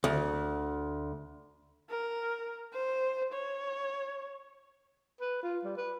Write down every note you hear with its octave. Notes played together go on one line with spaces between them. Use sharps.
D2
A#4
C5
C#5
B4
F4
G3
B4